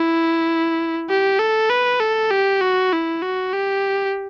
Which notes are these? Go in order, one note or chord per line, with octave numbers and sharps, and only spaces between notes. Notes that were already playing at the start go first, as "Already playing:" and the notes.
Already playing: E4
G4
A4
B4
A4
G4
F#4
E4
F#4
G4